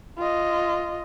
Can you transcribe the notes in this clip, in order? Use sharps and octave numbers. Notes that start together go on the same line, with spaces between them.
F4 D#5